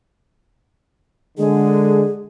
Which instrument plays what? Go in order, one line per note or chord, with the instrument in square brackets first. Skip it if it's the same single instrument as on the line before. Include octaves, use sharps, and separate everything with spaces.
[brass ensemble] D3 G#3 [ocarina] G#4